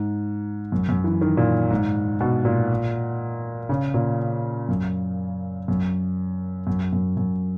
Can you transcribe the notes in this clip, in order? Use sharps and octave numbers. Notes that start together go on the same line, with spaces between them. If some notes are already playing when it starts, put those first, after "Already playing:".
Already playing: G#2
F#2
F#2
E3
D#3
A#2
G#2
B2
A#2
C#3
A#2
F#2
F#2
F#2
F#2
F#2